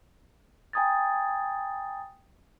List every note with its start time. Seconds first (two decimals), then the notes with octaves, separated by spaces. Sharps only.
0.73 G5 G#5 A#5 D#6 G#6 A6